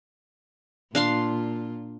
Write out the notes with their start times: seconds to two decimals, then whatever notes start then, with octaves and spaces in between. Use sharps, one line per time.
0.95 A#2 D4 F4 F5 C6